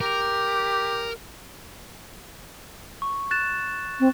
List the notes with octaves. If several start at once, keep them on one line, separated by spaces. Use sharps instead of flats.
G4 A#4
C#6
F#6 A6 E7
C4